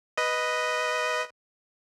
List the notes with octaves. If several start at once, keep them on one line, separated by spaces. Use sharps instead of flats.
B4 D#5